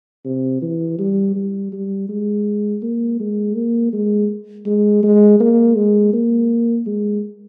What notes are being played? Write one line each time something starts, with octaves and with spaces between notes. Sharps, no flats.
C3
E3
G3
G3
G3
G#3
A#3
G#3
A#3
G#3
G#3
G#3
A#3
G#3
A#3
G#3